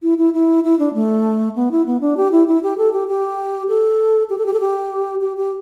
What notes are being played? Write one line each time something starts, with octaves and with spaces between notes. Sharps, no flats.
E4
E4
E4
E4
D4
A3
B3
E4
B3
D4
G4
E4
E4
G4
A4
G4
G4
A4
G4
A4
G4
A4
G4
G4
G4